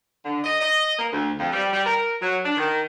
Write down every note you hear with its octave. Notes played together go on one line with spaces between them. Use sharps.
D3
D#5
D#5
A#3
D2
F2
G3
G3
A#4
F#3
D4
D#3